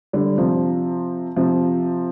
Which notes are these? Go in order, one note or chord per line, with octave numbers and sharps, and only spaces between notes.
D3 G3
C3 F3
C3 F3